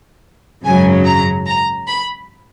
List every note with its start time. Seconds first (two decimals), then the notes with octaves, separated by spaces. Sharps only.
0.64 G#1 F#2 C#3 F#3 G#5
1.05 A#5
1.47 A#5
1.87 B5